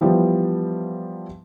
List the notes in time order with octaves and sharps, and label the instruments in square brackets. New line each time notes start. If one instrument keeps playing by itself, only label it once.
[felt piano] E3 F3 G3 B3